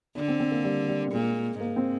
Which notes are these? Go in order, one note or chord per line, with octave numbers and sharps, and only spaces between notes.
D3 D4
C4
C4
A#3
G3
G3
A#2 G#3
G#2 A#3
C4